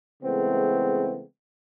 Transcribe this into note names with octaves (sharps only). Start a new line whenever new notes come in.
C#3 E3 G#3 A3 B3 C4